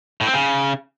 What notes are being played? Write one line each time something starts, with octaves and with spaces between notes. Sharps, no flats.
A2
C4
C#3